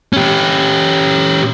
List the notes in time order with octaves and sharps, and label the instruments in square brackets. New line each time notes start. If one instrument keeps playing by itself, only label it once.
[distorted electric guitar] C#4 G4